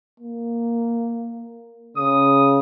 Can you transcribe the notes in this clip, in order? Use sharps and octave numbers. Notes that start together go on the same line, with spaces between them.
A#3
C#3 D#6